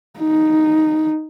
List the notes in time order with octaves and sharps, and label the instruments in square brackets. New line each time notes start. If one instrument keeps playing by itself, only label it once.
[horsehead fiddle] D#4